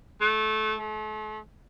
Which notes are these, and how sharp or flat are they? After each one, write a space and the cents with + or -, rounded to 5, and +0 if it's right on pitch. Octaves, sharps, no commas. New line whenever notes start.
A3 -20
A3 -40